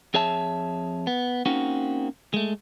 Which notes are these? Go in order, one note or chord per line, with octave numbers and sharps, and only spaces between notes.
F2 G#4 C#5 E5 A5
B3
A#3 C4 C#4 D#4 F#4
G#3 A3